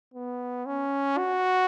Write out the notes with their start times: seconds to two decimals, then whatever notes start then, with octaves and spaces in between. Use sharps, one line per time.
0.14 B3
0.66 C#4
1.18 F#4